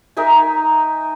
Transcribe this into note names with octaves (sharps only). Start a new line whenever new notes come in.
D#4 A#4 E5 G#5